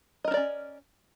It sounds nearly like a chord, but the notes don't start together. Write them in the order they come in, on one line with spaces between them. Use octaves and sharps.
D#5 A#4 D4 D5 C#4